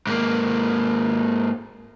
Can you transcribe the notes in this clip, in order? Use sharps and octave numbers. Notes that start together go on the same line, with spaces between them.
G#2 A#3